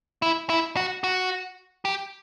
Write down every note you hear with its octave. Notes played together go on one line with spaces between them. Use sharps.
E4
E4
F#4
F#4
G4